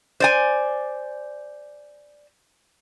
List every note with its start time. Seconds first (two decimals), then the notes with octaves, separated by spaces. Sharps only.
0.20 C5 D5 G#5